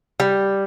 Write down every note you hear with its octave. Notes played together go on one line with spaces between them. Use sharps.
G3